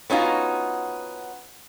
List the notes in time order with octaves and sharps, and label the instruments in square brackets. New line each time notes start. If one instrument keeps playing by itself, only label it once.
[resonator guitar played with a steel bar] B3 C#4 D#4 F4 F#4